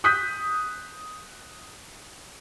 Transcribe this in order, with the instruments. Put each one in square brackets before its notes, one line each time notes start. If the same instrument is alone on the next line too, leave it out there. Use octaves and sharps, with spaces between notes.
[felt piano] D#6 F#6 G6 B6